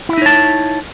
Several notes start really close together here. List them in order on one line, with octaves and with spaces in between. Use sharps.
E4 E5 D#4 C#5 A5